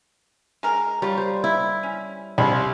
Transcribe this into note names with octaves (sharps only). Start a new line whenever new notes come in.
G#3 A#4
G3 F4 C#5
C5
E4
C#4
C2 F5 B5